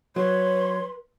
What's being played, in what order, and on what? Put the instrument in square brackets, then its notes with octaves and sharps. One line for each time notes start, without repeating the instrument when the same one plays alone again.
[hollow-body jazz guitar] F#3 [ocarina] B4 [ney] C#5 [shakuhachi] C6